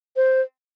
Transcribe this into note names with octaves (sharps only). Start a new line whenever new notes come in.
C5